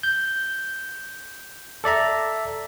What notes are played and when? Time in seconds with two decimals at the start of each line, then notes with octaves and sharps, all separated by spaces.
0.03 G6
1.84 A4 D5 E5 A#5